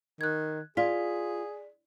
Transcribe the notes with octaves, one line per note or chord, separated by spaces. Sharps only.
D#3 F#6 G#6
F4 G#4 D5 B6